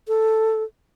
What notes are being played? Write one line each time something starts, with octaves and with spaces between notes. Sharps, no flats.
A4